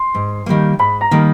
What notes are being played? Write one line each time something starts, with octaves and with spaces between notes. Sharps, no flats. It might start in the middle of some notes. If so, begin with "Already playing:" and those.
Already playing: C6
G#2
D#3 G3 A#3
G#2 B5
A#5
D#3 G3 A#3